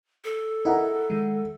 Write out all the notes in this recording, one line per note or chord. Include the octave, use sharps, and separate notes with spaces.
A4
E4 G#4 A#4 D#5 F#5 A#5
D#3 G#3